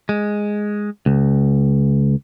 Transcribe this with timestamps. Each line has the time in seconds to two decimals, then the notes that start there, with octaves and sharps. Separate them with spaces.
0.09 G#3
1.06 C#2